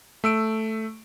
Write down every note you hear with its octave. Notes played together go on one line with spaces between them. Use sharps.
A3 E6 D7